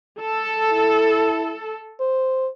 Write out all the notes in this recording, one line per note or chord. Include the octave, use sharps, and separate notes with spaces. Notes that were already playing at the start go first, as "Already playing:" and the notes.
A4
E4
C5